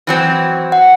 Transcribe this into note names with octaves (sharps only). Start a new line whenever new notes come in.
E3 F#3 C4
F#5